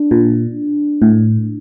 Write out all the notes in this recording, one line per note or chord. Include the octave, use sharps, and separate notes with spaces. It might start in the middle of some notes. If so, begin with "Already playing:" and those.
Already playing: D4
A#2
A2